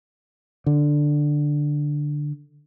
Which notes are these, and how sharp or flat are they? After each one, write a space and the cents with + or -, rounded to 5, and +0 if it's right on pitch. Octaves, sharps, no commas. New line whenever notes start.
D3 +5